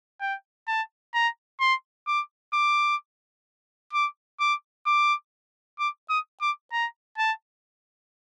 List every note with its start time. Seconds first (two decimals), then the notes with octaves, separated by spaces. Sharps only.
0.21 G5
0.68 A5
1.14 A#5
1.60 C6
2.07 D6
2.54 D6
3.93 D6
4.40 D6
4.86 D6
5.79 D6
6.10 D#6
6.41 D6
6.72 A#5
7.18 A5